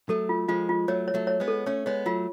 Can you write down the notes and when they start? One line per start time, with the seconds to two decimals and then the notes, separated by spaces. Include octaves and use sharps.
0.09 F#3 A3 A4
0.29 F4
0.48 F3 G#3 F4
0.69 F4
0.88 F#3 A3 C#5
1.08 C#5
1.14 F#3 A3
1.27 C#5
1.40 G#3 B3
1.48 A4
1.66 A3 C#4 C#5
1.86 G#3 B3 C#5
2.06 F#3 A3 F4